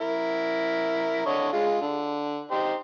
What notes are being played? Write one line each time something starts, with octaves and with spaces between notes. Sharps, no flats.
E4 A#4
D3 C#5 D#5
G#3 F4
D3
D#4 G4 C5